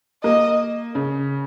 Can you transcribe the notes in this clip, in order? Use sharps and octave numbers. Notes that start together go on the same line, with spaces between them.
A#3 D#5
C#3